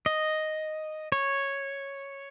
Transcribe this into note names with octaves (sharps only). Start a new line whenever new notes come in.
D#5
C#5